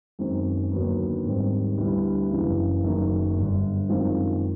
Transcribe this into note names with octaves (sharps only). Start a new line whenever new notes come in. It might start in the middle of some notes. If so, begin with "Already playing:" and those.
F#2 D#3 G#3 C4
D#2 D3 F#3 B3
G#2 D#3 G3 C4
D2 D3 G3 B3 E4
F#1 F#2 C#3 E3
F#1 F#2 D#3
G1 G2 D3
F#2 D#3 G#3 C4 F4